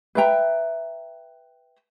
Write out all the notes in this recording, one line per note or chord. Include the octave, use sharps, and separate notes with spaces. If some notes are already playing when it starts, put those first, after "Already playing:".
B4 E5 G5 A#5